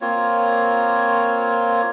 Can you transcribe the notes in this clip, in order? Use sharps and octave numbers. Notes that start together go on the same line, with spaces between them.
A#3 C4 F4 C#5